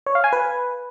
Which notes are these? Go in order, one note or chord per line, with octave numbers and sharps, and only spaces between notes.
C#5
F5
G#5
B4